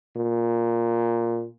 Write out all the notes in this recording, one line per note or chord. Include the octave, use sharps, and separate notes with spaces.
A#2